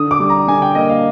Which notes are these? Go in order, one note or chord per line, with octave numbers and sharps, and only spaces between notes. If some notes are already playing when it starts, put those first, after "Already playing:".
Already playing: D3 D#6
D6
G3
A#5
D3 G#5
G5
A#3 D#5
F5